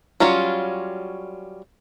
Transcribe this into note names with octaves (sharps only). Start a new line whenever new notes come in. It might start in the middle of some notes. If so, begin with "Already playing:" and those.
F#3 G3 C#4 F4